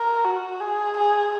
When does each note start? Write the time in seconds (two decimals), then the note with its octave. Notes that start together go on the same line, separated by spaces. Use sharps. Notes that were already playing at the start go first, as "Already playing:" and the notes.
Already playing: A#4
0.25 F#4
0.61 G#4
0.97 G#4